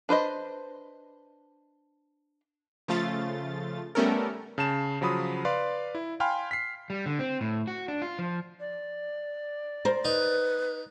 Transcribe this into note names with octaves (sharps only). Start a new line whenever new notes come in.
D4 B4 C5 D#5
C#3 F3 A3 F4 A6
G3 A3 B3 C#4 A4 A#4
C#3 A5 E7
C#3 F3 F#3 B5 D#6
B4 D5 F5 C6
E4
F5 G5 G#5 B5 C6 F6
B6 C7
G3
D3
C4
A2
F#4
D4
F4
F3
D5
A#4 C5
D#4 B4